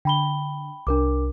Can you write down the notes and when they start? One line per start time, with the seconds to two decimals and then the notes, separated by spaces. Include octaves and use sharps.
0.05 D3 G5 B5 G7
0.87 C2 D4 A#4 D6